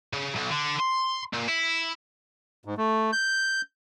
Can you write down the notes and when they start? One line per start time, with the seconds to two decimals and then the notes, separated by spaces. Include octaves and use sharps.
0.13 C#3
0.36 B1
0.52 D3
0.80 C6
1.34 A#2
1.49 E4
2.65 G#2
2.77 A3
3.12 G6